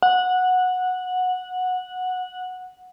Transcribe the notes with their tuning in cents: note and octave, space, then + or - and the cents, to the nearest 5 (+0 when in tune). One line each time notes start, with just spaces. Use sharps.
F#5 -15